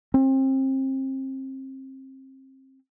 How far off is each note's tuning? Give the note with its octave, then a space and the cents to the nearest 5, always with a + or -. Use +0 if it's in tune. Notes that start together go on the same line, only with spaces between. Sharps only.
C4 +30